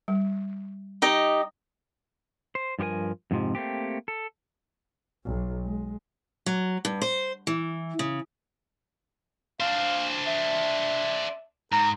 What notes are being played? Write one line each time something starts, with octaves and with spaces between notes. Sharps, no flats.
G3
D#4 G4 D#5
C5
G2 F3 G4 A#4 G#5
F2 G#2 C3 F3
A3 A#3 C4 G4
A4
B1
G#3
F#3
G2
C5
E3
C#3
D4 C5 F5
E5
G#2 A#5